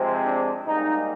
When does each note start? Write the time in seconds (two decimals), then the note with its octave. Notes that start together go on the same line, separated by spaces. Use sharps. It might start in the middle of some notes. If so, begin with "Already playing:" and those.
Already playing: C3 F3 G#3 C4
0.25 D4
0.66 G#2 G3 A#3 D#4